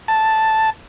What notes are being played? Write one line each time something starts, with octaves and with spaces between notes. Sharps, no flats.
A5